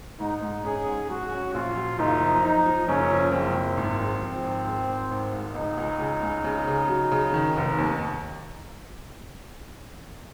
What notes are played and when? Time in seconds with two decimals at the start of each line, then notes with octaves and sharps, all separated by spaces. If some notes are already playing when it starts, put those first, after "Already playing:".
0.20 G#2 D#4
0.42 G#2
0.65 C#4 G#4
0.87 G#2
1.10 F#3 F#4
1.31 C#4
1.54 A#1 F4
1.76 F#3
1.99 F#1 D#4
2.20 F3
2.42 F3 D#4
2.65 F3
2.87 F#1 C#4
3.10 F3
3.32 F#1 C4
3.54 F#1
3.77 G#1
4.00 G#3
4.22 F3
4.43 G#1
4.65 G#3
4.89 G#1
5.11 G#1
5.32 G#2
5.54 C#2 D#4
5.77 C#2
5.99 C#3
6.22 C#2
6.44 C#3
6.67 C#3
6.89 F#3
7.11 C#3
7.34 D#3
7.56 F1
7.78 D#2